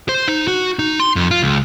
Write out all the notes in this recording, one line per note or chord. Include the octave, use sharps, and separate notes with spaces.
C5
D#4
F#4
D#4
C6
F2
F4
C#2